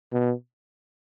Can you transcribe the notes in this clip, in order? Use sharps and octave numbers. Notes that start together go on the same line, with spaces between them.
B2